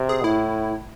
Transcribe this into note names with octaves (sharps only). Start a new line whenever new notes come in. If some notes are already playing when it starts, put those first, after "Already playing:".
Already playing: C3
G#4
A2 E4